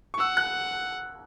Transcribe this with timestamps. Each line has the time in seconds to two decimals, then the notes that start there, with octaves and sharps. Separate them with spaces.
0.14 C#6
0.19 F#5 E6
0.37 F#6